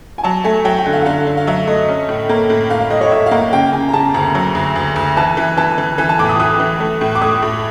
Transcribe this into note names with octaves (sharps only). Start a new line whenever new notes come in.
G#5
F#3 A5
A3 G#5
F#3 G5
G5
D3
F5
F#5
D3 F5
D3
F5
F#3 E5
A3 D#5
C#4
A2
A#3
A2
A2 F5
F5
A2 D#5
C#5
A2 E5
F5
A#3 F#5
C#3 G5
C#3 G#5
A#5
C#3 A5
D2 A#5
F#3
D2
D2
D2
E3 A5
E3
E3 A5
E3
E3 G#5
A5
A2 D6
D#6
E3 D#6
E3
A3
A2
D6
A3 D#6
A2